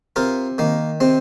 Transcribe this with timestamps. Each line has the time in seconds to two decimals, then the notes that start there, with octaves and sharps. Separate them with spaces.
0.16 C3 F4 A#4
0.58 D#3 A#3
1.00 C3 C4